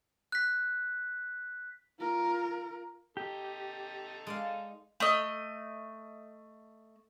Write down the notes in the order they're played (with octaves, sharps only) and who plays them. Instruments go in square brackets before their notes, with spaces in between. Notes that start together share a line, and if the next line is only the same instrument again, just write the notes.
[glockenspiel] F#6 B6
[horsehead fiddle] F4 A#4
[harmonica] D#4 A4 [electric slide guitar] G4
[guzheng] G#3 D5 F5
[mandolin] A3 D#5